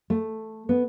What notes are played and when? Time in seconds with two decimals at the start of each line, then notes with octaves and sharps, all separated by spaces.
0.10 A3
0.69 B3